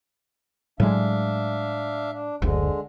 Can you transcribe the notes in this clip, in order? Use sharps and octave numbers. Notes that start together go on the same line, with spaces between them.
A2 F#3 G#3 D4 E5 F5
D4
F#1 D2 D3 G#3